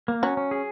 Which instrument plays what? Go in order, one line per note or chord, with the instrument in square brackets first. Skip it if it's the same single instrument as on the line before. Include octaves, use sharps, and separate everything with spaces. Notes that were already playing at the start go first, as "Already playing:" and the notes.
[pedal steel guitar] A#3
[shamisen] F#3 [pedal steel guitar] C#4
[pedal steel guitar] C#4
G#4